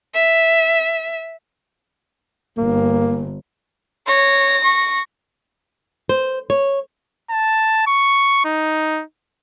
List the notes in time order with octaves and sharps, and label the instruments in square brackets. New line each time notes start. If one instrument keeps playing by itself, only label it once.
[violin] E5
[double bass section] G1 [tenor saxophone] A#3
[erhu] C#5 [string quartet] A#6
[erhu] C#6
[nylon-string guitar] C5
C#5
[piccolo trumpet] A5
C#6
D#4